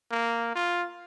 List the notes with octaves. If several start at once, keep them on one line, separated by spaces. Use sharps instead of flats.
A#3
F4